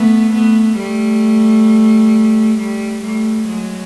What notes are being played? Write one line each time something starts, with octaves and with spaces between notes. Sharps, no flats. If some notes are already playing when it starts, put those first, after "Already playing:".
Already playing: A3 B3
A3 B3
G3 A3
G3 A3
G3 A3
F#3 G#3